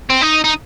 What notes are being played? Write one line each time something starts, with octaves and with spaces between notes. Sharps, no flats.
C4
D#4
D#4